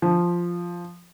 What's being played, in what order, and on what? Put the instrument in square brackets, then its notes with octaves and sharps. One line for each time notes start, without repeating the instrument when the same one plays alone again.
[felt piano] F3